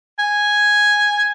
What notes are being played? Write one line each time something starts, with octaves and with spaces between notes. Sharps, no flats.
G#5